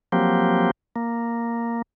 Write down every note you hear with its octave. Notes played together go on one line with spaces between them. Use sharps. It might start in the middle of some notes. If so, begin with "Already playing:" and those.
F3 F#3 A#3 C4 G4
A#3